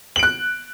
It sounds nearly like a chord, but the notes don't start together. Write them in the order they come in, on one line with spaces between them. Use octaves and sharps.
F#7 D7 F#6